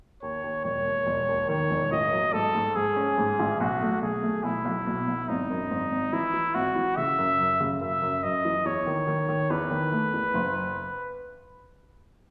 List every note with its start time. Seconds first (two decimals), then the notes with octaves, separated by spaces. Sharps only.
0.22 D#2 C#5
0.44 D#2
0.65 E1 C#5
0.86 D#2
1.07 E1
1.29 D#2
1.49 D#3 C#5
1.71 E1
1.92 A1 D#5
2.12 F#3
2.33 G#2 A4
2.55 G#2
2.76 G#2 G#4
2.96 C#4
3.18 G#2
3.39 A1
3.60 B1 F#4
3.81 A3
4.02 B1 G#4
4.23 A3
4.44 B1 E4
4.65 B1
4.86 B2
5.08 B1
5.28 G#1 D#4
5.50 F#2
5.71 G#1
5.92 G#1
6.13 E3 E4
6.34 E3
6.54 G#1 F#4
6.76 E3
6.97 C#3 E5
7.19 F#2
7.39 F#2
7.61 C#3
7.81 F#2 E5
8.02 F#2
8.23 F#2 D#5
8.45 E3
8.65 E2 C#5
8.87 D#3
9.07 D#3
9.29 D#3
9.50 E2 B4
9.71 D#3
9.92 A3
10.14 E2
10.34 F#1